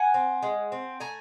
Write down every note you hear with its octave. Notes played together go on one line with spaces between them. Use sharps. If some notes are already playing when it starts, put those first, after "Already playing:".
Already playing: F#5 G#5
C4
G#3
C4
A3 G#5 A#5